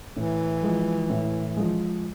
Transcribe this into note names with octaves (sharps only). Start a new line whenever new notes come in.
A2 E3
F3 G#3
A2
F3 G#3